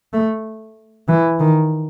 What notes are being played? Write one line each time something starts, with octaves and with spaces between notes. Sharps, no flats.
A3
E3
D#3